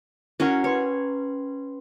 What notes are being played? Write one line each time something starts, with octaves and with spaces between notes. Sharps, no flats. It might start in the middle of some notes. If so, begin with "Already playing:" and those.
C#4 E4 F#4 A#4 C#5 F#5
C#4 B4 C#5 C6